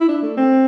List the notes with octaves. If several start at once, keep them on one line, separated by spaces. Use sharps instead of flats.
E4
D4
A3
C4